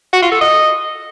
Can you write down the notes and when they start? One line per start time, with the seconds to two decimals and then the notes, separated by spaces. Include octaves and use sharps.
0.13 F#4
0.22 F4
0.32 A4
0.41 D#5